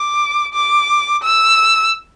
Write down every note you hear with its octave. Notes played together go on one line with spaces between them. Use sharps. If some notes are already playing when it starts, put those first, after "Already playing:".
Already playing: D6
D6
E6